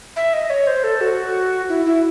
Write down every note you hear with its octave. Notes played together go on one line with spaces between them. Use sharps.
E5
D#5
C#5
C5
A4
F#4
E4
E4